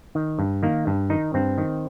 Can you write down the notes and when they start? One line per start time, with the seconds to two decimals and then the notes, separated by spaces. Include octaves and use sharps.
0.15 D#3
0.39 G2
0.63 D#3 A#3
0.87 G2
1.10 D#3 D#4
1.34 G2 C4
1.58 D#3